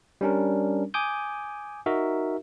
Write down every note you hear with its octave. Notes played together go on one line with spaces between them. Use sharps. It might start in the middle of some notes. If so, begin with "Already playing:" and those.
G3 C#4 D4 A#4
G#5 D6 D#6 G6
D#4 F#4 A#4 E5